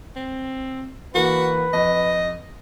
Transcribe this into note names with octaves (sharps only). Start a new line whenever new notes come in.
C4
E3 A#3 F#4 B4
F2 D#5